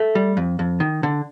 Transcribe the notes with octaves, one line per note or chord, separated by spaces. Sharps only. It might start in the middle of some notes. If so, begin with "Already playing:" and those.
Already playing: A3
G3
F2
F2
D#3
D3